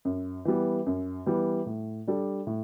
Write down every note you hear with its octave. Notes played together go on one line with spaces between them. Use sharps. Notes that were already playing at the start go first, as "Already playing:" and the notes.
F#2
E3 G3 B3
F#2
E3 G3 B3
A2
G3 D4 A4 D5
A2